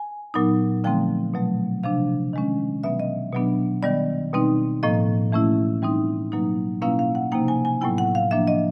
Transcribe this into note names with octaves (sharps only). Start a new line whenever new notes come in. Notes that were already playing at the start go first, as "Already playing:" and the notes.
Already playing: G#5
A#2 F#3 B3 D#4
D3 F3 A3 C4 G5
B2 F#3 A3
C3 F3 A3 D4 F5
D#3 G#3 C#4
B2 F#3 B3 E5
D#5
B2 F#3 B3 D4
D#3 G3 B3 D5
B2 G3 C4 D#4
A2 F3 A#3 D#5
E3 A3 C#4 E4
E3 G3 C4 D#4
B2 F#3 A#3 D#4
B2 G3 A#3 C#4 E4 F5
F5
F#5
C3 F3 A#3 D#4 G5
G#5
G#5
A2 F#3 B3 E4 G5
F#5
F5
F3 A#3 D4 E5
D#5